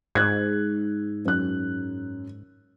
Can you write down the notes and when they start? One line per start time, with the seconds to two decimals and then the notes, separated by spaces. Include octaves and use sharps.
0.15 G#2 F#6 G#6
1.25 F#2 F#6